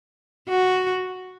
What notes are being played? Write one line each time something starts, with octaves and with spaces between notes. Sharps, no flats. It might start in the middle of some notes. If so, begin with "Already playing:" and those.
F#4